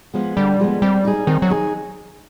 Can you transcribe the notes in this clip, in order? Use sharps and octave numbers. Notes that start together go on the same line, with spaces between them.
F3 G#3 B3
D3 G3
F3 G#3 B3
G3 C4
D#4 G#4
D#3 C4
F#3
D#4 G#4